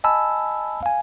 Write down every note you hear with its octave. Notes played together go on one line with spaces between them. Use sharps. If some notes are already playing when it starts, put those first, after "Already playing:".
D#5 G#5 A5 B5 E6
F5 G#5